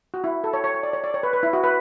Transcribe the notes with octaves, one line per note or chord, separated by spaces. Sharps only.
F#4
E4
A4
C#5
C#5
C#5
D5
C#5
D5
C#5
B4
B4
E4
F#4
B4